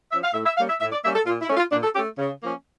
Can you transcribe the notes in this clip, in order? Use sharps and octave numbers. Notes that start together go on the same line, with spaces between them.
F3 C#4 E5
F5
A2 E5
E5
G3 A#3 C#4 F5
E5
A2 E5
D5
G3 A#3 C#4 E5
A4
A#2 F4
E4
A3 C#4
F4
A#2 D4
A4
A3 C#4 G4
C#3
F3 A#3 C#4